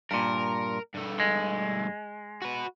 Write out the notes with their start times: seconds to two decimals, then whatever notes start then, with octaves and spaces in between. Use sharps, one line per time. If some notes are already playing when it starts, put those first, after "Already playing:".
0.11 G2 A#2 A#4
0.95 G2 A3
1.20 G#3
2.42 F#4 B4